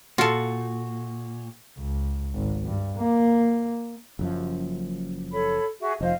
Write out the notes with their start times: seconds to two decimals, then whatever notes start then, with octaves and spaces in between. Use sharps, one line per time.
0.18 A#2 F4 F#4 A4
1.78 C#2
2.34 G#1
2.66 G2
2.98 A#3
4.19 F#1 F#2 F3
5.32 A4 C#5 B5
5.81 F#4 G#4 E5
6.01 F1 F3 C5 D#5 F5